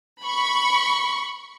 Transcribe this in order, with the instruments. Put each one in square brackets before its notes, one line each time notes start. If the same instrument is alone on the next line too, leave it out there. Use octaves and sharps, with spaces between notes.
[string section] B5 C#6